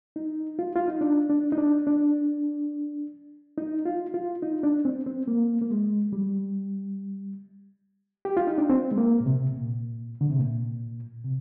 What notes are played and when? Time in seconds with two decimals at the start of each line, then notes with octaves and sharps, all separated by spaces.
0.16 D#4
0.59 F4
0.76 F4
0.88 D#4
1.01 D4
1.30 D4
1.52 D#4
1.58 D4
1.87 D4
3.58 D#4
3.85 F4
4.14 F4
4.42 D#4
4.63 D4
4.85 C4
5.07 C4
5.28 A#3
5.61 A#3
5.71 G#3
6.13 G3
8.25 G4
8.37 F4
8.47 D#4
8.58 D4
8.70 C4
8.91 G#3
8.98 A#3
9.20 A#2
9.26 C3
9.54 A#2
10.21 D3
10.30 C3
10.39 A#2
11.25 C3